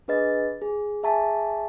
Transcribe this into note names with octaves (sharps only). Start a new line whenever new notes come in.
D4 G#4 B4 D#5 A6
G#4
G#4 E5 G#5 A5 C#6 B6